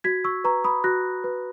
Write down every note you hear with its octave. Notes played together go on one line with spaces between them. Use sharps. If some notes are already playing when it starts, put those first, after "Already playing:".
F#4 G#6 B6
C#6 E6
B4 A#5 C#6
B5 D#6
F#4 F#6 A#6
B4